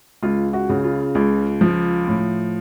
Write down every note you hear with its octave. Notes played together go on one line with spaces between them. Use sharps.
C#2 F4
F#4
C#3
F4
C#2
F3
A2